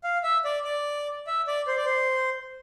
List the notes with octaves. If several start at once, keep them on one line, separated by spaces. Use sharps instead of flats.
F5
E5
D5
D5
E5
D5
C5
D5
C5